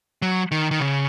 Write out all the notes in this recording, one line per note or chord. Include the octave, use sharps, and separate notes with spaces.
F#3
D#3
D#3
C#3